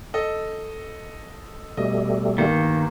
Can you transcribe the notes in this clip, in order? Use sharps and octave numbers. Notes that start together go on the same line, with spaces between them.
A4 D#5
B2 G3 A3 D#5
G1 D#3 A#3